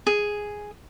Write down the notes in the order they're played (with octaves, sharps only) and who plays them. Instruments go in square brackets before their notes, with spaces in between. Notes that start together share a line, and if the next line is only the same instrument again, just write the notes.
[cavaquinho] G#4